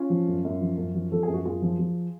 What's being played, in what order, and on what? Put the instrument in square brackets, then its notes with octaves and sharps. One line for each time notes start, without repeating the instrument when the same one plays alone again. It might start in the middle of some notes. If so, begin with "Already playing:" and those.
Already playing: [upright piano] C#4 F4
F3
F#2
F#2
F3
F#2
F3
F3 A4
G#4
F#2
F#4
F#2 F4 G#4
F3
F3